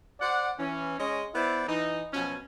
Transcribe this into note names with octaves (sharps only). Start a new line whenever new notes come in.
C5 D5 F#5
E3 C#4
G#3 C#4 C#5 D#5
B3 E4 B4 C5 D5
E3 D#4
B2 F3 F#3 C#4